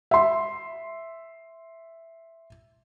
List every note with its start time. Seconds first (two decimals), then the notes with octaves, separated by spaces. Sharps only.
0.11 E5 C6